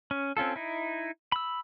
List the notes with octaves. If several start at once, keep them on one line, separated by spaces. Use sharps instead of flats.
C#4
C4 C#4 F4 A4
D#4 E4
B5 E6